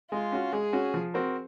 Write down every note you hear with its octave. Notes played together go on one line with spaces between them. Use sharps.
G#3 F4
C#4 F#4
G#3 G#4
C#4 F#4
F3
C4 F#4 A#4